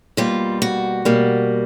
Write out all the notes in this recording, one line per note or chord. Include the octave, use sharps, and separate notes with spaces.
B2 G3 A#3 F4
F#4
B2 G3 A#3